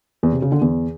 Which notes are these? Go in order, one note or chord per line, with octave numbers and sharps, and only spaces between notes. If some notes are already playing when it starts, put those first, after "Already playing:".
E2
C3
C#3
D3
E2